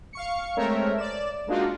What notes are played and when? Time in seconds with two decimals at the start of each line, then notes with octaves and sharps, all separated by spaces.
0.13 F5 C#6 C#7
0.57 G#3 A3 C4 A#4 C#5 E5
0.97 D5 E7
1.47 G#3 A#3 D4 D#4 F4 F#4